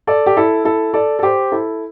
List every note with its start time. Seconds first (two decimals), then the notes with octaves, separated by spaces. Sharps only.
0.07 A4 D5
0.26 G4
0.37 E4 A4
0.65 E4 A4
0.94 A4 D5
1.19 A4
1.23 G4 C5
1.52 E4 A4